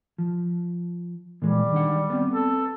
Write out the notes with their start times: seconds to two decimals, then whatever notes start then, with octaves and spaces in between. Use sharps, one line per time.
0.18 F3
1.42 A#2 E3 G3 G#3
1.72 D#3 D4 F#5
2.10 B3 C4
2.34 A4